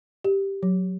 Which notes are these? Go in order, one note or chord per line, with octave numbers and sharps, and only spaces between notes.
G4
F#3